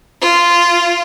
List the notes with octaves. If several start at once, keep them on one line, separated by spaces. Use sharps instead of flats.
F4